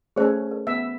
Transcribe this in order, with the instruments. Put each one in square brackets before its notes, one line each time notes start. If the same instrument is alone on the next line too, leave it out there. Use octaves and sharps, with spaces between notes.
[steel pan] A3 C#4 A4 [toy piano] G#4 C5
[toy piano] A#4
[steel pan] B3 E5